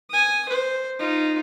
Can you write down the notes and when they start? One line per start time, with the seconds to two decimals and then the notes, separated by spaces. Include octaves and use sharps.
0.10 G#5 D#6
0.49 C5
1.00 D#4 F4